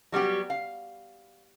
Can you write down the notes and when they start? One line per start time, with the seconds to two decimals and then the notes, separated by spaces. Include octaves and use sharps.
0.12 F#3 G3 B3 G4
0.50 F5